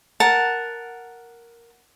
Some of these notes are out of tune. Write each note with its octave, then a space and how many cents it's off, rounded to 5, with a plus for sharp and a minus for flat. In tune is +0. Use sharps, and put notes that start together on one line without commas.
A#4 +0 F#5 +0 A5 +0